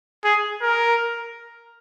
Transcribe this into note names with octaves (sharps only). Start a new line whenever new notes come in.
G#4
A#4